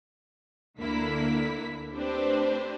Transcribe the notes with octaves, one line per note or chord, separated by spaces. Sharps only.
D2 D3 A#3 E4 B6
A3 C4 D4 G4 B4 C5